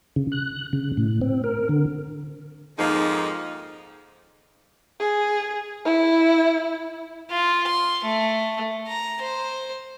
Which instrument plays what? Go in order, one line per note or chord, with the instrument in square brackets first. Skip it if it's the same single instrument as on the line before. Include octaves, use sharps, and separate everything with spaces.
[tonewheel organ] C#3
F#6
C#3
A2
C4
A#4
D3
[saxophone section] F2 G#2 F3 G#3 A#3 D#4
[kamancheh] G#4
E4
[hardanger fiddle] F4
C6
A3
A#5
C5